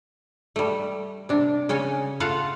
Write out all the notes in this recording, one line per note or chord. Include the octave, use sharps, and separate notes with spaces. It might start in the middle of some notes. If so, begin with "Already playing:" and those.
G3 A3
C3 D4
C#3 C#4 C#5 G#5
A3 F4 F5 F#5 A5